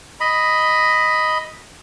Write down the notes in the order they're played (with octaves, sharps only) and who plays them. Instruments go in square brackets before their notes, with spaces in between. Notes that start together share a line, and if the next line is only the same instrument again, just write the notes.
[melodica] D#5 B5